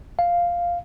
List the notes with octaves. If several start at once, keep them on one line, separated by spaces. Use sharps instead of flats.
F5